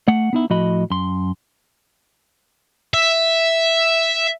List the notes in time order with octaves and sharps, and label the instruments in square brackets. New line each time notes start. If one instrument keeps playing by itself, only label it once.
[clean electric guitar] A3 F#5
B3 D#4 E4
A2 F3 F#4 D#5 B5
F#2 C6
[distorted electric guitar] E5